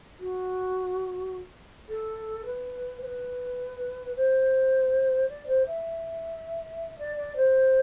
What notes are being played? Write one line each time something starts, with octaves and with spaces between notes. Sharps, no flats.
F#4
A4
B4
C5
B4
C5
D5
C5
E5
D5
D5
C5